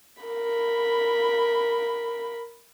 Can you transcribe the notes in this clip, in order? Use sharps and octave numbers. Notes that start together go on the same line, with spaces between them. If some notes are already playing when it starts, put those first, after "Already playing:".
A#4 B5